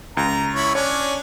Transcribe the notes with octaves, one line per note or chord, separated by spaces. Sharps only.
C#2 A#5
E4 C#5
C#4 D4 C#5